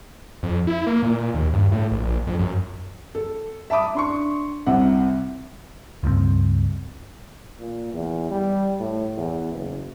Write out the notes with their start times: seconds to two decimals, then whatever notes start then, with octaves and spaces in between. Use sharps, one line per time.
0.43 F2
0.67 E4
0.87 A#3
1.03 A#2
1.34 D#2
1.53 G2
1.72 A2
1.92 A#1
2.27 F2
2.39 F#2
3.15 A4
3.70 E5 A5 B5 D6 D#6
3.95 D4 C6 C#6
4.66 C2 C3 C4 F#5
6.03 C#2 G2 F#3 C4
7.59 A#2
7.93 E2
8.31 G3
8.80 A2
9.17 E2
9.53 F#1